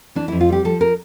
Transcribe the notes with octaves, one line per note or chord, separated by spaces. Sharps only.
E3 D4
E4
F2
F4
G3 G4
F3 A4
A#4